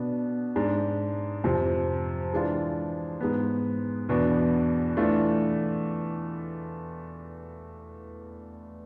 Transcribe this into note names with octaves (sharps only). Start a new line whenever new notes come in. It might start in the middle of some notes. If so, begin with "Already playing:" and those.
Already playing: B2 B3 D4
G#2 G#3 D4
F2 C3 F3
E3 G#3 D4 F4
G#2 G#3 B3
E2 B2 B3 D4
E3 A3 D4 F4